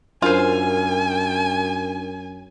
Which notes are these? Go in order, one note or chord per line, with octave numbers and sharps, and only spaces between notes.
F#2 D4 F4 A#4 C5 G#5 C7